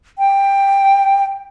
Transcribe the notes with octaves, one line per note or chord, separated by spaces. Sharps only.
G5